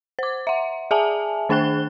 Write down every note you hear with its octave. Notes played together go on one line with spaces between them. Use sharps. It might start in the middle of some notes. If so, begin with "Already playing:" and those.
C5 D6
E5 F#5
G#4 E5 G#5 A5
D#3 D4 C5 G5 F#6 G7